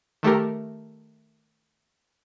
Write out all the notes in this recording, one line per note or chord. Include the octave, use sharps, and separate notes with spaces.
D#3 A3 G4 A#4